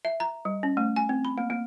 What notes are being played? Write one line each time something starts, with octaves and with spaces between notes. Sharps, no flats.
E5
A#5
G3
C#4
A3
G#5
C4
B5
A#3
A#3